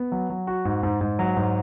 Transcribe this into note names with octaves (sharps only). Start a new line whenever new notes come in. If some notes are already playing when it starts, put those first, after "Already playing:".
Already playing: B3
F#3
F#3
F#4
G#2
G#2
G#2
F#3
G#2